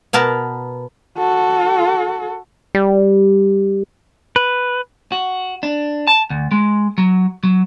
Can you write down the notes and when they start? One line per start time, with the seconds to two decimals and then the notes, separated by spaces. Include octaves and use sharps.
0.13 B2 B3 A#4 A5
1.18 F#4 A4
2.75 G3
4.36 B4
5.12 F#4
5.63 D4
6.07 A5
6.30 D2
6.52 G#3
6.98 F#3
7.43 F#3